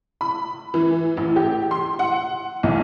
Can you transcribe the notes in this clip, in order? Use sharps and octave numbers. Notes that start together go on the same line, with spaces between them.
B5
E3
A1
G4
C6
F#5
B1